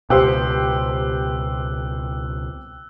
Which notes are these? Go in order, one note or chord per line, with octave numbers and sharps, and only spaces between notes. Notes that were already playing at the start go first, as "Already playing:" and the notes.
C#2 B2 G4 C5 E6 F#6